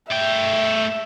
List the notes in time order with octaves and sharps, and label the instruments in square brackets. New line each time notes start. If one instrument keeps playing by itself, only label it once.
[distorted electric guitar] A3 G5 [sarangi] E5